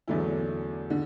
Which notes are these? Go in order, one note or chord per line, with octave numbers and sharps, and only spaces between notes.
E2 D3 F#3 A3 E4
D3